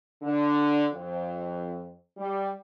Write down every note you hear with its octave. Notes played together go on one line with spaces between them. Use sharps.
D3
F2
G3